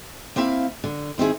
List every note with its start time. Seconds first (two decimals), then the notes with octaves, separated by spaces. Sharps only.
0.36 A#3 C4 E4 E5 F5
0.84 D3
1.18 D#3 C4 E4 G#4